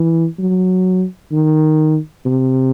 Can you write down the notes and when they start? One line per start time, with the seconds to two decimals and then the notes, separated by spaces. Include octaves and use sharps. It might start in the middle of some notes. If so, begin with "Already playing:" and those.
Already playing: E3
0.39 F#3
1.32 D#3
2.26 C3